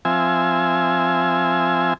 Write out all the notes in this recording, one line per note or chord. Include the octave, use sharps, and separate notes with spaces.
F3 C4 E5 G#5